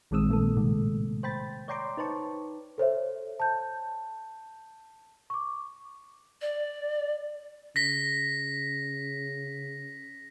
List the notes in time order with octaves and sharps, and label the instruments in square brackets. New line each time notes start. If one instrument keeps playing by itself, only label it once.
[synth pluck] A#1 D#3 G#3 C4 D#6 E6
A#2 D#3 A3 A#3 A4
A2 C3 D#3 G#3
C5 G5 B5 A6
C#5 D5 G5 A#5 C6 D6
D#4 B4 C5 A5 C#6
[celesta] A4 C5 C#5 E5
A5 G6
C#6 D6
[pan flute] D5
[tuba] C#3 [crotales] A#6 B6